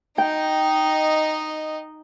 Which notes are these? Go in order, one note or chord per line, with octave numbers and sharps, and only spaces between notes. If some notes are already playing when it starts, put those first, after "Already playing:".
D#4 D#5 G5